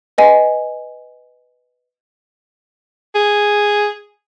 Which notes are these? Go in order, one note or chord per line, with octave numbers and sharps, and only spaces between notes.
B4 D#5 G#5
G#4